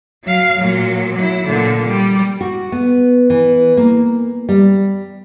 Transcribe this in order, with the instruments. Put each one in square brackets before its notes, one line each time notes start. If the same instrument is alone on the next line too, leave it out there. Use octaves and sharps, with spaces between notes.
[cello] F#3 F5
A#2 F#3
F#3 E4
A#2 D3
G3
[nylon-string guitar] F#4
B3
E3
A#3
G3